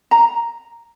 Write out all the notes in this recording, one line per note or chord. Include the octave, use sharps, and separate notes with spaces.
A#5